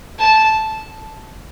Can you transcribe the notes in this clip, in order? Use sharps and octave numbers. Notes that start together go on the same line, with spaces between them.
A5